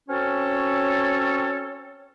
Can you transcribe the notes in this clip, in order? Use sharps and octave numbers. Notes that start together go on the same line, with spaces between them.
C4 C#4 F#4 A4 C#5